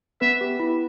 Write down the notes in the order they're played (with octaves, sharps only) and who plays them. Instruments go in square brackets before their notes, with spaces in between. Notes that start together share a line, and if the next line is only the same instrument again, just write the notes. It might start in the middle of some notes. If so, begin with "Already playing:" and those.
[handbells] B3 B4 [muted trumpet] E5
[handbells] G4
E4